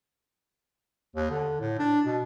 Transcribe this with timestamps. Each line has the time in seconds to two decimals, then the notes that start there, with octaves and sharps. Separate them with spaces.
1.16 D#2
1.31 D3
1.60 A2
1.79 D4
2.06 B2